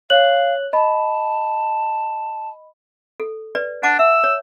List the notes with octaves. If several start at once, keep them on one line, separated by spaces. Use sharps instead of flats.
C#5 F5 F#6 F#7
D#5 A5 B5
A4
B4 D5
D4 F#5 A5 D6
E5 E6
C#5